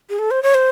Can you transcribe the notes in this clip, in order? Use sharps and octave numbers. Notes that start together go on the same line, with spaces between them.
G#4
A4
C5
C#5
C5